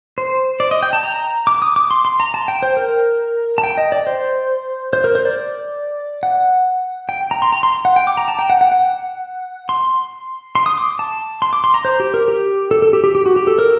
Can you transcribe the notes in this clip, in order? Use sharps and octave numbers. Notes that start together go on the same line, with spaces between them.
C5
D5
D#5
G5
A5
A#5
D6
D#6
D6
C6
C6
A#5
A5
G5
C5
A#4
A5
G5
D#5
D5
C5
C5
A#4
C5
D5
F#5
G5
A#5
C6
A#5
C6
F#5
G5
D6
A#5
A5
G5
F#5
F#5
F#5
C6
C6
D#6
D6
A5
C6
D6
C6
A#5
C5
G4
A#4
G4
A4
A4
G4
G4
G4
F#4
G4
A4
A#4